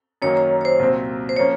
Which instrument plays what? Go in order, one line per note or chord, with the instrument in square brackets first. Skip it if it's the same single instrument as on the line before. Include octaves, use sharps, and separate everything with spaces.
[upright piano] F#2 D#3 F#3 A#3 [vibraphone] C#5
[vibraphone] C#5
C#5
C5
[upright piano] C2 A#2 F#3 C4
[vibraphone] C5
[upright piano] F3 A#3 C#4 [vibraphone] C#5